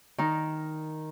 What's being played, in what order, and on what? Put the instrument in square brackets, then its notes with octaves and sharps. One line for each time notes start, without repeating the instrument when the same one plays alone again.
[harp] D#3 D#4